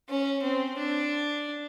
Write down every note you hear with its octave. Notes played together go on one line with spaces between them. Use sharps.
C#4
C4
D4